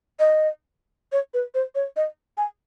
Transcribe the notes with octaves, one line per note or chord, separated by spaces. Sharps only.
D#5
C#5
B4
C5
C#5
D#5
G#5